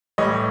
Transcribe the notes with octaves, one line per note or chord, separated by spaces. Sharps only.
A2 E3 G3 C#5 D#5